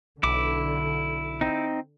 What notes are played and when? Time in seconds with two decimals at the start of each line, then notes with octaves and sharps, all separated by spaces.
0.23 B1 D3 E4 D6
1.41 C4 D#4